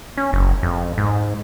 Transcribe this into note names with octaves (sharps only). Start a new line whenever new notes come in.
C#4
F#1
F2
G#2